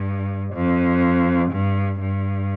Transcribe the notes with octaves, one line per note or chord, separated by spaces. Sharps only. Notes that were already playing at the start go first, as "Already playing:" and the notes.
Already playing: G2
F2
G2
G2